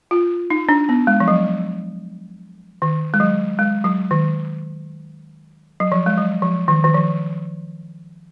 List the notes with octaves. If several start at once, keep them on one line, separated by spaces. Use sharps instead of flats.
F4
D#4
D4
B3
G#3
F3
F#3
D#3
G#3
F#3
G#3
F#3
D#3
F#3
F3
G#3
F#3
F3
D#3
D#3
F3